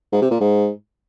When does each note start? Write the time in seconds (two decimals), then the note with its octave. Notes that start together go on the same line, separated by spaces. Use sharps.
0.12 G#2
0.22 C3
0.31 A#2
0.41 G#2